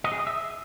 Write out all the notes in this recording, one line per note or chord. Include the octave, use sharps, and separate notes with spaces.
D#5
G#4
D#5
E5